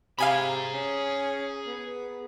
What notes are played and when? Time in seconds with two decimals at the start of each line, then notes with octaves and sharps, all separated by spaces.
0.19 C3 G#4 F5 G#5 A#5 B5
0.74 C#4
1.66 B3